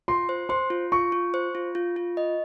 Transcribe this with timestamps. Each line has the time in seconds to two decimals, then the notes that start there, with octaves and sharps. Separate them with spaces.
0.08 F4 C6
0.29 C5
0.49 C5 C6
0.70 F4
0.92 F4 C#6
1.12 F4
1.34 C5
1.55 F4
1.75 F4
1.96 F4
2.17 D#5